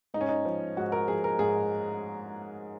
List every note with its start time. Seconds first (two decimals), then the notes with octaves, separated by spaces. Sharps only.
0.14 G#2 D#4
0.21 C#4
0.29 D#4
0.45 F3
0.77 G#2 F#4
0.92 A#4
1.08 F3 G#4
1.24 A#4
1.39 G#2 G#4